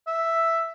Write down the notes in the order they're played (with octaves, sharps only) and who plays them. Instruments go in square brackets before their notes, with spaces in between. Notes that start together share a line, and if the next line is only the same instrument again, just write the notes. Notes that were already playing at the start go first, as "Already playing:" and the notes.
[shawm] E5